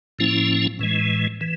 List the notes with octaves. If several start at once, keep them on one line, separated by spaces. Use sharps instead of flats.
A2 F3 A#3 C#4 E4
A2 E3 G#3
E3